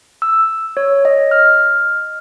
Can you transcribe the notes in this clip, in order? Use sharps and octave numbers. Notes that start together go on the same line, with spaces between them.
E6
C#5
D#5
F6